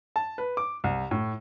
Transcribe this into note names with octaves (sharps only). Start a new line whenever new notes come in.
A5
B4
D6
C2
A2